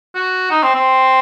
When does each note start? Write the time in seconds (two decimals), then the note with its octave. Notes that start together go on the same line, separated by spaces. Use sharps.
0.15 F#4
0.51 D#4
0.63 C4
0.75 C4